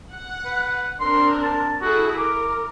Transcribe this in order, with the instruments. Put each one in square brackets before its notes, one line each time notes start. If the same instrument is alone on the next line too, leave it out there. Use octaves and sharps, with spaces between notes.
[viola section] F#5
[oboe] B4
[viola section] C4 D4 A#4 [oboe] C6
[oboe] A5
[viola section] E4 G#4 A4 [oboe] F#4
[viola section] A#4 [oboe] D6